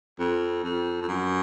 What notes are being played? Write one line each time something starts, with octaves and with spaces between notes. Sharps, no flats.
F2
F2
F2
F#2